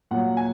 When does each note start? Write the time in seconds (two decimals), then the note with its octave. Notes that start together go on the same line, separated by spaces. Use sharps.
0.11 A#2 F#3 F#5
0.37 G#5